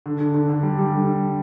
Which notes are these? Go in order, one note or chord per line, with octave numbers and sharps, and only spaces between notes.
D3
D3
D3
D3
G3
G3
D3